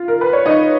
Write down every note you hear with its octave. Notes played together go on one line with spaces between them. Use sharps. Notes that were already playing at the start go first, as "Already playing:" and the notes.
Already playing: F4
A#4
B4
C#5
D#4 D#5